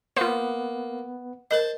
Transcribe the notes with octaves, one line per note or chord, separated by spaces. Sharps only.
A#3 B3 F4 B4 C5
A#4 C5 D#5 A5